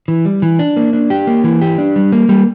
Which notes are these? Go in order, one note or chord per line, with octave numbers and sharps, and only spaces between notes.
E3
G3
E3
D4
A#3
D4
G4
A#3
E3
G4
D4
G3
A#3
G3